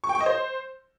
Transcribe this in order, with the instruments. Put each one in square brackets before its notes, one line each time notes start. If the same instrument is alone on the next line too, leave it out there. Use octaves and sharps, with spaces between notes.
[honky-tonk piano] C#6
G5
C#6
D#5
C5